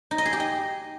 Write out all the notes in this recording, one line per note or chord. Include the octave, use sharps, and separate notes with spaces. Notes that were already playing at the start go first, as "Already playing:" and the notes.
D#4
D#5
G#4
G4
D#5